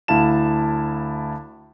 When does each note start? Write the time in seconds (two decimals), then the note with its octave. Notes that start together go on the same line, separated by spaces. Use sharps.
0.08 D2 E4 F5 A5 E7